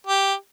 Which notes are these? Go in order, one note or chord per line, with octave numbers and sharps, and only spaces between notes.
G4